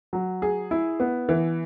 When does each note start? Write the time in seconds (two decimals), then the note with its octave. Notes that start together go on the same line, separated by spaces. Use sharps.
0.13 F#3
0.42 G#4
0.71 E4
1.00 B3
1.29 E3